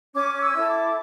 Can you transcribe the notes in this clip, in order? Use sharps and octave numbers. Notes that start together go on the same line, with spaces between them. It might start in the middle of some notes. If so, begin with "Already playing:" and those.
C#4 D6
D6
E6
E4 A4
D6